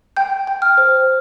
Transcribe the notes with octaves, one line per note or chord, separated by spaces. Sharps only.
G5 G6
G5
F6
C5